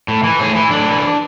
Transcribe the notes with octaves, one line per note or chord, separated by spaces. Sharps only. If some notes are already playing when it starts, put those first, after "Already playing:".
A2
E3
A2 G#4
E3 E4
A2 D4
E3